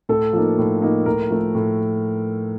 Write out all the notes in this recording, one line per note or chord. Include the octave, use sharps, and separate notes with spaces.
A2 A4
F3 A#3 D#4
A2
F3 A#3 D#4
A2 A#4
F3 A3
A2